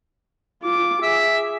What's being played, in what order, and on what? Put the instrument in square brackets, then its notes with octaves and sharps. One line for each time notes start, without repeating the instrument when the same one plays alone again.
[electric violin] F4 D6
[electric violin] G#4 [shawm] E5